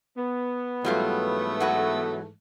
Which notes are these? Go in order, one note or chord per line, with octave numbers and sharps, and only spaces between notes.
B3
G#2 E3 F#3 G3 A3 F4
F#3 F#4 B4